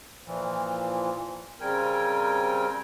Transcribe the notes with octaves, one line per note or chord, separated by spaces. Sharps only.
A#2 E3 F3
C#3 G3 C4 A#4 G5 G#5